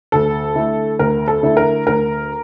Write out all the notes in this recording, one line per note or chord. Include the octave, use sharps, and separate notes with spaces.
D2 A4
D3 A3 E4
D2 A#4
A4
D3 A3 E4
A#4
D2 A#4